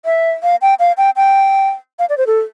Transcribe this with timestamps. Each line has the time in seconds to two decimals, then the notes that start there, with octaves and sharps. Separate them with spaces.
0.05 E5
0.43 F5
0.62 G5
0.79 F5
0.98 G5
1.16 G5
1.99 F5
2.09 D5
2.18 C5
2.27 A4